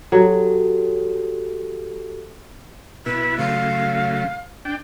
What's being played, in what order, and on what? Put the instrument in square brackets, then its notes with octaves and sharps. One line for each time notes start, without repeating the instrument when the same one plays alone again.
[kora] F#3 [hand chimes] F#4 G4 A4
[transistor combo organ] B2 E4 [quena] B4
[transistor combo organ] C#3 F#3 A3 [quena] F5
[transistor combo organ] D4 G5